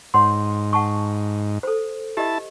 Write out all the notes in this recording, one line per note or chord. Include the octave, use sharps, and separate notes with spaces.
G#2 C#5 F#5 C6
F#5 A5 C#6
A4 C5
E4 G4 D#5 A5